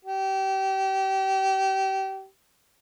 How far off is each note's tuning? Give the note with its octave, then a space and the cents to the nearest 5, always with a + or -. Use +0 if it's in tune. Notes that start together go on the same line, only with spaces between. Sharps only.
G4 -30